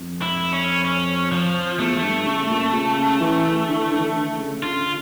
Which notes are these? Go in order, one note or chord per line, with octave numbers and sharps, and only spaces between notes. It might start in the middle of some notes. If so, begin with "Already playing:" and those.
Already playing: F2
E4
C#4
C#4
F3
E2 A3
G2
C#3
A#2
C#3
E3
D3
D3
E3
D3
D3
C#3
D3 F4